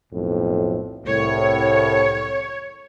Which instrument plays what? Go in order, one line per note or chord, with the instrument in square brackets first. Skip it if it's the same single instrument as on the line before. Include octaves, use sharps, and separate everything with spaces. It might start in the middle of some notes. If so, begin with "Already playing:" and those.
[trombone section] B1 F2 A2
[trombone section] C2 A2 [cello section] C#5